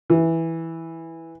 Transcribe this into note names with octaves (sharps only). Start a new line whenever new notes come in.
E3